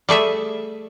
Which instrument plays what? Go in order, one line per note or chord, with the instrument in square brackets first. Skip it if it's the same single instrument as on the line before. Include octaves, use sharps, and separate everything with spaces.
[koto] G3 A3 G#4 E5